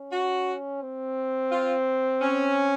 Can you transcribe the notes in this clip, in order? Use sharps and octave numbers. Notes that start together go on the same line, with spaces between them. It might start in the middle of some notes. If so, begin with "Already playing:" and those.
Already playing: C#4
F#4
C4
F4
C#4